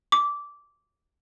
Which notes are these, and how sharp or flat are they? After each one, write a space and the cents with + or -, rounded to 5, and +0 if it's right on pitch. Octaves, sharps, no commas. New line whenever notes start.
D6 -15